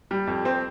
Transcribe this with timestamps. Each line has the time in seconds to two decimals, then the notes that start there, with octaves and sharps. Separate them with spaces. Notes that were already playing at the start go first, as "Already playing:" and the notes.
0.11 G3
0.27 F2
0.45 C4